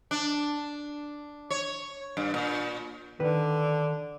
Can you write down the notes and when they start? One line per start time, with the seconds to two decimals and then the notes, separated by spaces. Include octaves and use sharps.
0.11 D4
1.50 C#5
2.17 G2
2.34 A#2
3.20 D3 D#3 B4